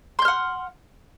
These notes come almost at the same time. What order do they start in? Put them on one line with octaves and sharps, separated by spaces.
C6 G6 F6 F#5